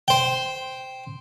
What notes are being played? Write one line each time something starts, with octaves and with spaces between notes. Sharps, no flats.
C5 G5